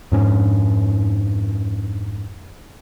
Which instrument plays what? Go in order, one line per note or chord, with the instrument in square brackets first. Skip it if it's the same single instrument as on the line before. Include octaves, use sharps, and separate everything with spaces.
[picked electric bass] F2 G#2 C#4